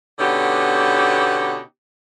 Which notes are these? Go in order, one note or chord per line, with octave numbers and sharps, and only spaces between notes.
B2 D3 B3 C#4 D#4 G4